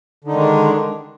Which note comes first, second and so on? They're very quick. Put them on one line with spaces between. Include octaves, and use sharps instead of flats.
D3 D#4 D#3 G#3 D4